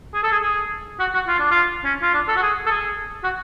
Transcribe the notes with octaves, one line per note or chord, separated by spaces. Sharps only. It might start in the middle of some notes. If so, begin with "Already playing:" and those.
G#4
A4
G#4
G#4
F#4
F#4
F4
D4
F4
C#4
F4
D4
A4
F#4
G#4
A4
G#4
F#4